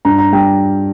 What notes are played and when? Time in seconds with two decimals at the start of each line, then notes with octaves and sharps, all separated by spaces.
0.05 G2 A#5
0.18 A#5
0.33 G3 G5